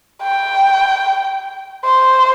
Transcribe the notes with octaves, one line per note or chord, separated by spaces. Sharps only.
G5
C5